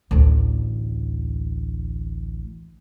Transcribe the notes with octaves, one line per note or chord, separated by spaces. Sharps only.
A1 D2